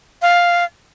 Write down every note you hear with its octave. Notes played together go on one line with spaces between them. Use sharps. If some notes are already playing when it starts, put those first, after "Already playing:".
F5